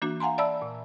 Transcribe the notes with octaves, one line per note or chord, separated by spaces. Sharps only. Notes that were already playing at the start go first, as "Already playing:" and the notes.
E3 A#3 D4 F#4
F5 F#5 G#5 A#5 C6
D5 E5 A5 B5 E6
A#2